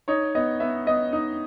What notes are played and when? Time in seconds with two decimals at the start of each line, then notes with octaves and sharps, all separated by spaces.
0.08 D#4 C#5
0.35 B3 D#5
0.60 B3 E5
0.87 B3 D#5
1.13 D#4